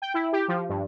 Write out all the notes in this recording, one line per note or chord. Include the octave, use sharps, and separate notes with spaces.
G5
E4
G4
F3
G2